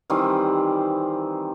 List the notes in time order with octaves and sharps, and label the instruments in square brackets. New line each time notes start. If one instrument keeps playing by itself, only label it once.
[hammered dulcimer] D#3 E3 G3 C4